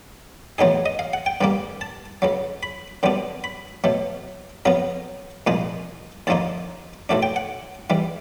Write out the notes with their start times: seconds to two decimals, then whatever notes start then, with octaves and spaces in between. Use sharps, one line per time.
0.58 A1 A2 F#3 B3 D#4 G#4
0.86 D#5
0.99 F5
1.13 F#5
1.26 G5
1.41 G2 D3 G3 A#3
1.81 A5
2.22 C#2 C#3 F#3
2.63 B5
3.03 F#2 D3 G3 B3 D4
3.44 B5
3.84 B2 F#3 A3
4.65 F2 C#3 F#3 B3 A#5
5.47 C2 A#2 F3 G#3
6.27 D#2 D3 F3 A#3 D#4 A5
7.09 B1 A2 F#3 A3 D4
7.23 G5
7.36 F#5
7.90 G#2 E3 G3